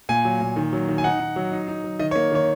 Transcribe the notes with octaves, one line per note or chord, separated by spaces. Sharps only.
A#2 G#5
F#3
A#2
D#3
F#3
D#3
G#5
D#4 F#5
D#4
F#3
D#4
D#4
F#3
D#3 D#5
C#5
A#3
D#3 C#5